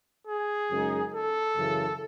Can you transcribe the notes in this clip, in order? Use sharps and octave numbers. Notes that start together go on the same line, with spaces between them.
G#4
F#2 C#3 G#3 D#4
A4
F#2 C#3 E3